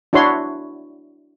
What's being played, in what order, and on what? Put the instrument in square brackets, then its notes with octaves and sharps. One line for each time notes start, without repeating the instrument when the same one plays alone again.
[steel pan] D4 E4 F#4 C#5 C6